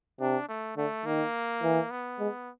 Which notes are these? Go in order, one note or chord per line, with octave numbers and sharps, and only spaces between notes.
C3 D4
A3
D3 A3
D#3 A#3
E3
B3
G#3